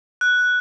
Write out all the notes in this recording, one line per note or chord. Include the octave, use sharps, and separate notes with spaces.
F#6